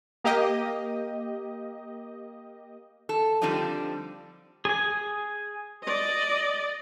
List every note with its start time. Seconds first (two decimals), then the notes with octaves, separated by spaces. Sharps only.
0.24 A#3 G4 D#5
3.09 A4
3.42 D3 F3 G3 C4 D4 D#4
4.65 G#4 G#5
5.84 D5 D#5